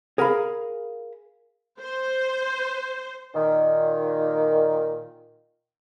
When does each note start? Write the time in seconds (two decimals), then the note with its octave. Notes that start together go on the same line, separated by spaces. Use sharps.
0.18 G#4 A#4 F5 A#5 B5
1.79 C5
3.34 A#2 D#3